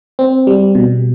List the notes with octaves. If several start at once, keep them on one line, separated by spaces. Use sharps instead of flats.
C4
G3
B2